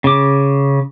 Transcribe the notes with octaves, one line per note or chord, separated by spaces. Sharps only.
C#3 D6